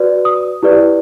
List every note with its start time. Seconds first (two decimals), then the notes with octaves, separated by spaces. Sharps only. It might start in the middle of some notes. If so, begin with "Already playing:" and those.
Already playing: F#4 B4 D5
0.25 D#6
0.63 E4 G4 B4 D5